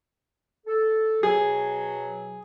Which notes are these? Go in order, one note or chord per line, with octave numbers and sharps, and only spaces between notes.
A4
B2 F#3 G#4